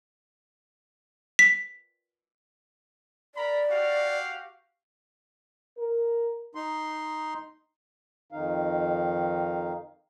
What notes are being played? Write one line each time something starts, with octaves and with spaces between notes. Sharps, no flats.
B6
A#4 D5 A#5 B5
F#4 G4 F5
A#4
D#4 C6
F2 D#3 D#4 F5